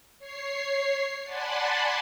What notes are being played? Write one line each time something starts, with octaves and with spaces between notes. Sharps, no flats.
C#5 C7
D5 F#5 G#5 A5 B5 C6